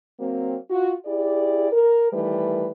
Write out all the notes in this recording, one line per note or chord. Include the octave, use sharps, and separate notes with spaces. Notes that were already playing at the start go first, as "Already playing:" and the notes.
F#3 A#3 C4
F4 F#4
E4 G4 G#4 D5
A#4
D#3 E3 G3 A3 B4